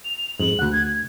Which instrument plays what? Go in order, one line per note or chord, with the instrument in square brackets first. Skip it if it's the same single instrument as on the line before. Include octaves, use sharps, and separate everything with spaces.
[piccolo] F7
[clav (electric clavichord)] F2 G#2 [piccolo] F#7
[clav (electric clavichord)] D2 F#5 [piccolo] F#6
[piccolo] G#6